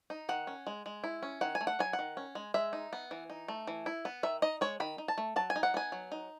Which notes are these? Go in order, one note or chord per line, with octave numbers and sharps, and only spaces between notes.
D#4
D#3 F#5
C#4
G#3
G#3
E4
C#4
D#3 F#5
G#5
A3
F#5
F#3 G#5
F#5
D#3
C#4
G#3
G#3 E5
D#4
B3
E3
D#4
A3
E3
E4
B3
D#3 E5
D#4 D#5
G#3 C#5
D#3 B5
D#4
A5
A3
F#3 A5
G#5
D#4
F#5
B3 G#5
F#3
D#4